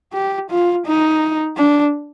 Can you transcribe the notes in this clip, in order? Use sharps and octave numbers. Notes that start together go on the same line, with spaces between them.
G4
F4
D#4
D4